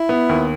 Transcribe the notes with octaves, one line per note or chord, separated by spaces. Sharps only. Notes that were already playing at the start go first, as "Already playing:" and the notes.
Already playing: E4
B3
D#2